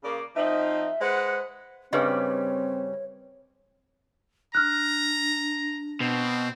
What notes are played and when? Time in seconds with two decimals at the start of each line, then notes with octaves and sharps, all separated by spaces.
0.04 C#3 A#3 D5
0.36 F3 C4 D#4 E5
1.01 G#3 B4 C5 F#5
1.93 G2 C#3 G3 C4 G#4 B4 C#5 D#5
4.55 D4 A#5 F6 F#6
6.00 B2 C4